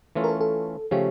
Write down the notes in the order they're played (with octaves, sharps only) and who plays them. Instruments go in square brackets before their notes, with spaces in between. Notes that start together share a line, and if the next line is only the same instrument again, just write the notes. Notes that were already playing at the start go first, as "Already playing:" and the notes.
[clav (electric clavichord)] E3 A3 C#4 F4
[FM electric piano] A#4
A4
A4
[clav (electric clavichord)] C#3 F3 A3 C#4 [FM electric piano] G4